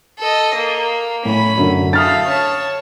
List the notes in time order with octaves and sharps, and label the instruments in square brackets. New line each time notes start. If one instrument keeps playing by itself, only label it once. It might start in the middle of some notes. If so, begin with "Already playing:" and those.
[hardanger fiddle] A4 D#5
A#3
[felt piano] A2 [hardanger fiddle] C#4 B5
[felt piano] F#2 D3
[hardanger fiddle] A3 F5 [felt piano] D#6 F6 A6
[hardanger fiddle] C#5 A5